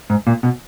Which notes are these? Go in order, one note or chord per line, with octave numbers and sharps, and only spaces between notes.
G#2
A#2
B2